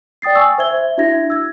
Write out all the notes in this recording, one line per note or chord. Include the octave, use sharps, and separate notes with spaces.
D5 G5 D#6 A6 C7
G#5 C#6 E6
C5 E5 G#6 G7
E5
D4 E4 F#4 E5 G#6 A#6
E6 G#6